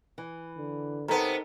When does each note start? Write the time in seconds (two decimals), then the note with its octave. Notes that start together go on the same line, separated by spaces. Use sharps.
0.18 E3
0.58 D3
1.08 C3 B3 D#4 A4 A#4 A5 A#5